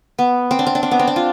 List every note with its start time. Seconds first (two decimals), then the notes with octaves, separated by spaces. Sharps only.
0.19 B3
0.51 C4
0.59 D4
0.67 C4
0.75 D4
0.83 C4
0.91 B3
0.99 C4
1.07 D4
1.16 F4